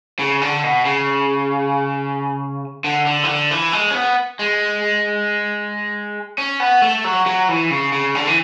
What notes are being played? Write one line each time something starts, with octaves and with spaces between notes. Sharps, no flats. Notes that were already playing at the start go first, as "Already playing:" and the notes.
C#3
D3
B2
C#3
D3
D3
E3
D3
E3
G#3
C#4
B3
G#3
C#4
B3
A3
F#3
F#3
E3
C#3
C#3
D3
E3